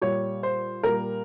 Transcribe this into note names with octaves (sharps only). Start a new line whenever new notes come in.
A#2 G3 C#5
C5
A#2 G3 A#4